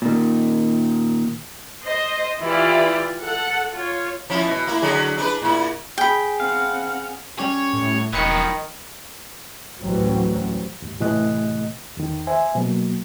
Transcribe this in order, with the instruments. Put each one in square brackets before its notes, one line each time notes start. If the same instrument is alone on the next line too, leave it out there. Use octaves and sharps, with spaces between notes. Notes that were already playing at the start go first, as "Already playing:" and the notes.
[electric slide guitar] A#2 D#3
[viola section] C5 D#5
E3 E4 F4 G4 D5
A4 F#5
F4 C#5
[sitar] F3 C#4 E4
B2
A#3 E4
D3 F#3 G#4
D4 D#4 B4
A#2 E4
[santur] G#4 [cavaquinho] G5 B5
[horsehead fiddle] C4 F#5 [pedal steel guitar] F5
[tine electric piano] G3 C#4 G4 [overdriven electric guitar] C#5
[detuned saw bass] A2
[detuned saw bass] E1 [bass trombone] D#3 [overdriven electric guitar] F3 F#3 [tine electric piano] B5 C#7
[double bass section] A1 D2 E3 F#3 G3 C4
[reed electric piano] D#2 G#2
A2 C3 E3 A3 D#5 F#6
E2 D#3
C5 E5 G#5
B2 F#3 A#3